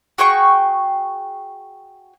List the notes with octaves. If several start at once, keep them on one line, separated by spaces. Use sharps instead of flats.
F#4 G#4 G5 C#6